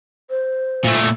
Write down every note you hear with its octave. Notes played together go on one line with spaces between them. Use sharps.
C5
A#2 A3